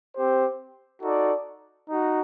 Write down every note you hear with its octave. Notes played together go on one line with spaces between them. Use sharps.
C4 G4 C5
D#4 F#4 A4 D5
D#4 F#4